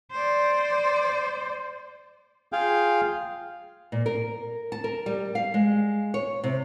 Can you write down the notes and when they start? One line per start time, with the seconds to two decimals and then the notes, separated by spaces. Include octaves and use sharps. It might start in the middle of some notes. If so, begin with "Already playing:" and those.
0.12 C5 D5
2.52 F4 G#4 F5 G5
3.92 A#2
4.06 A#4
4.72 A5
4.84 A#4
5.06 G3
5.35 F5
5.54 G#3
6.14 C#5
6.44 C3